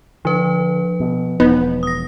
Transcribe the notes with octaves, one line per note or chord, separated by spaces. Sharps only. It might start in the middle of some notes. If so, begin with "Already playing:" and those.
D3 F3 B4
B2
E1 B3 D#4
D#6 A#6